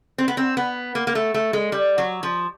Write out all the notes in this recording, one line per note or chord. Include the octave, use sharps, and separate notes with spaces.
C4
B3
C4
B3
A#3
A#3
A3
A3
G#3
G3
F#3
F3